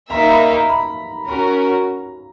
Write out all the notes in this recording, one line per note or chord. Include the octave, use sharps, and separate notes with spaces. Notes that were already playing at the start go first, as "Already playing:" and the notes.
A#3 D#4 A#4 E5 A#5
B5
A#5
B5
C#4 F#4 A#4 A#5